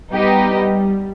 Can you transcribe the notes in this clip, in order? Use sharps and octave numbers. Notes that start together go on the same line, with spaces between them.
G3 B3 D#4 G4 B4 D#5